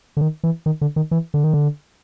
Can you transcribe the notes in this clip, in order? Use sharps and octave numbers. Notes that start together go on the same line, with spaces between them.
D3
D#3
E3
D#3
D3
D#3
E3
D3
D#3
D3